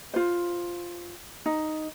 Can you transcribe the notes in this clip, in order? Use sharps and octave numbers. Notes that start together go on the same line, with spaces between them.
F4 C5
D#4